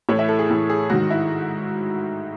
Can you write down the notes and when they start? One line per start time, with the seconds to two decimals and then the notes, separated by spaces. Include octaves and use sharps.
0.09 A2 E3 C#5
0.19 E5
0.29 A4
0.39 G#4
0.50 A2 E3
0.70 G#4
0.90 G#2 D#3 F#4
1.10 E4